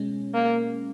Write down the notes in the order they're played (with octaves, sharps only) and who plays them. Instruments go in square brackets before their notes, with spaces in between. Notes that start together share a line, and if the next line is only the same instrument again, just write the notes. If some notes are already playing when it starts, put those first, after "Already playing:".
Already playing: [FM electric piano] B2 G#3 C#4
[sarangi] A#3